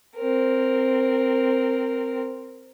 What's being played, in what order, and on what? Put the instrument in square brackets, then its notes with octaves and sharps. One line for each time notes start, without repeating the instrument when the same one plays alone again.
[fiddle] C4 A#4